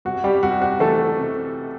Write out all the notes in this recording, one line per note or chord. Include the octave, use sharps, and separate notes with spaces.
C2 F#4
G3 G4
C2 F#4
F#4
E3 A3 A4
C3